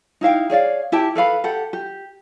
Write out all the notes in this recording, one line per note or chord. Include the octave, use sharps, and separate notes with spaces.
D#4 E4 F5 G5
G#4 C#5 D5 F5
E4 G4 G5 A5
A4 B4 F5 B5
G4 A4 F#5
G4